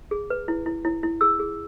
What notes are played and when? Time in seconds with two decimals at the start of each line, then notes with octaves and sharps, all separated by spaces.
0.11 G#4
0.30 B4
0.48 E4
0.66 E4
0.85 E4
1.03 E4
1.21 G#4 E6
1.39 G#4